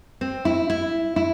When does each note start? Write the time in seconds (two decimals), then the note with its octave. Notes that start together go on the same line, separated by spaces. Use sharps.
0.21 C4
0.45 E4
0.70 E4
1.16 E4